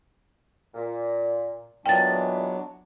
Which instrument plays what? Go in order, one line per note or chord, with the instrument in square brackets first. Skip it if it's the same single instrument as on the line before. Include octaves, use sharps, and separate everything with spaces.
[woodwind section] A#2
[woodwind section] A#2 E3 G#3 [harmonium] F#3 B3 D4 [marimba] G5 A6